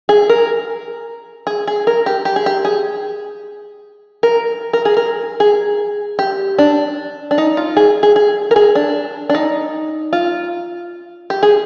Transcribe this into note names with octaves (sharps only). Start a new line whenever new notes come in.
G#4
A#4
G#4
G#4
A#4
G4
G4
G#4
G4
G#4
A#4
A#4
G#4
A#4
G#4
G4
D4
D4
D#4
F4
G#4
G#4
G#4
A#4
G#4
D4
D4
D#4
F4
G4
G#4